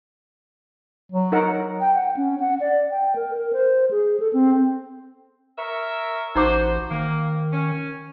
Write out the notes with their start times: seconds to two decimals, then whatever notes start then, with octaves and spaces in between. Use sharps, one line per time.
1.12 F#3
1.32 D#4 A#4 F#5
1.81 G5
1.95 F#5
2.17 C#4
2.40 F#5
2.60 D5
2.91 G5
3.16 A#4
3.34 A#4
3.53 C5
3.91 G#4
4.20 A4
4.33 C4
5.58 A#4 C#5 E5
6.35 A1 D#4 F#4 C5 A#5 D6
6.91 D#3 A#3
7.53 C#4